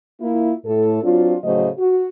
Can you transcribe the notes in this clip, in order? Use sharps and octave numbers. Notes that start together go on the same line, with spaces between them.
A#3 E4 F4
A2 A4
F#3 C4 D4 F4
A2 C#3 F#3 A3 C5 D#5
F#4